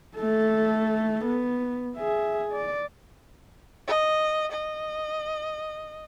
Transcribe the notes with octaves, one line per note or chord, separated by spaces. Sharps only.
A3 A4
B3
G#4 E5
D5
D#5
D#5